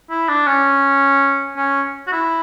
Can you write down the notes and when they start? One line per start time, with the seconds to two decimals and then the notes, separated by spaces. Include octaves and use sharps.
0.10 E4
0.28 D4
0.47 C#4
1.57 C#4
2.07 F#4
2.12 E4